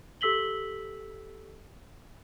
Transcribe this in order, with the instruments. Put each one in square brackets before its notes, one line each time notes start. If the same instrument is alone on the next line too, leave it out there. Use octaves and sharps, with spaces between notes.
[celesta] G4 A4 E6 B6 F#7 G7